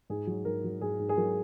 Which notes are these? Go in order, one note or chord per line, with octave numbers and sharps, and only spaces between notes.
G#2 G#4
F#3
G#2 A#4
F#3
G#2 G#4
G#2
G#4
F#3 A#4